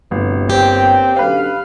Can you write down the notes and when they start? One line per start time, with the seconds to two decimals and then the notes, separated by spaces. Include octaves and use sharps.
0.11 G1 D2 A2 C3
0.50 A#3 C4 G4 C#5 G5
1.19 F#2 B2 D3 B4 F5